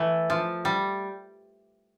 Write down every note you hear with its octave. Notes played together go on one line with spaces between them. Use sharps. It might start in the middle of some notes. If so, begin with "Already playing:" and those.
Already playing: E3 A3
F3
G3